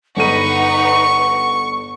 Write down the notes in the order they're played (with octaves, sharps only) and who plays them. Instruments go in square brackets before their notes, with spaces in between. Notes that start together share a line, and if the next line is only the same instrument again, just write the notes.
[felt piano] G1 A4 D#7 [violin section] D#4 B4 [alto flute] F#5 [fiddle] C#6